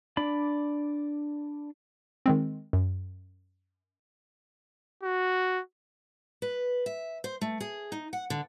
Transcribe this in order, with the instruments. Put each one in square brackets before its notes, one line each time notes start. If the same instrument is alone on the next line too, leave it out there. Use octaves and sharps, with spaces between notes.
[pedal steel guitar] D4 D5 B5
[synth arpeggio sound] D#3 G#3 C4
F#2
[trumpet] F#4
[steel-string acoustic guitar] B4
E5
C5
A3
G#4
D#4
F#5
D3